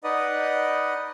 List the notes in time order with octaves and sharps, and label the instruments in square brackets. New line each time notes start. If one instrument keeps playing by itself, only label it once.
[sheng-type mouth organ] D#4 B4 D5 D#5 F#5 D#6